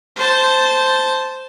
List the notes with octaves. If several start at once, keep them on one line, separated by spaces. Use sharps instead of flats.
C5 A5